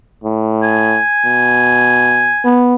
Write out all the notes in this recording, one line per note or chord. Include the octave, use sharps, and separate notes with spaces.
A2
G#5
B2
B3